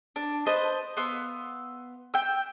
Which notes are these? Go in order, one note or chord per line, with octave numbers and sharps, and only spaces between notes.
D4
B4 C5 D#5 A5
B3 F5 C6 E6
G5 E6